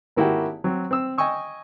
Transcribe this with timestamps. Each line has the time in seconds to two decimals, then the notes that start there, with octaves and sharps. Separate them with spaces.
0.16 G#1 A#3 E4 F#4 G4 G5
0.64 F#3 C4
0.91 C4 E6
1.18 D#5 G5 G#5 C#6 E6